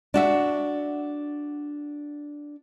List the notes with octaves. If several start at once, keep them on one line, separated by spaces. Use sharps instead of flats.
D4 F#4 E5